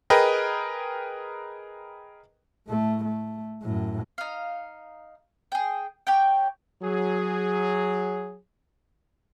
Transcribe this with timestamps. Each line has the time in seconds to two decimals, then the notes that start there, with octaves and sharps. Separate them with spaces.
0.10 G#4 A#4 B4 D#5 G5
2.67 A2 A3
3.05 A3
3.63 F#2 A2
4.18 D#4 F5
5.52 G#4 G5
6.07 G4 C#5 G5
6.83 F#3 G#4